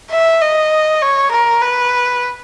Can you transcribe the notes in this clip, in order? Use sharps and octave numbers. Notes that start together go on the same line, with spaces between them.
E5
D#5
C#5
A#4
B4